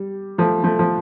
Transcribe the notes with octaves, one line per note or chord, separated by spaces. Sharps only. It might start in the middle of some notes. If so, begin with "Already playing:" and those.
Already playing: G3
F3 A3
F3 A3
F3